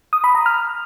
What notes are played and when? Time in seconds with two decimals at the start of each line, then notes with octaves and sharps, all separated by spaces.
0.13 D#6
0.24 B5
0.35 A#5
0.46 F6